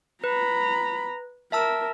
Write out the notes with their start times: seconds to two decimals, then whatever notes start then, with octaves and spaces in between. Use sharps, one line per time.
0.24 B4 A#5 B5
1.52 A#4 E5 A5 E6